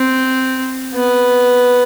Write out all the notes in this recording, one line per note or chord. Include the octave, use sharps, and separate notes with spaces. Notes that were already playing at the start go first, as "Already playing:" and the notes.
Already playing: C4
B3